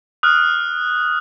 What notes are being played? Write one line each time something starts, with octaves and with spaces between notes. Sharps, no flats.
D#6 F6 F#6